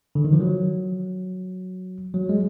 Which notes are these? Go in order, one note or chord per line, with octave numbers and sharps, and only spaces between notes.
D3
D#3
F3
F#3
F#3
G#3